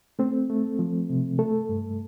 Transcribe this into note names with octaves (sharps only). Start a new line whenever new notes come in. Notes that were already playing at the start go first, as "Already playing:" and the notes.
A3 C4
A3
F3
C3
A3 A4
G2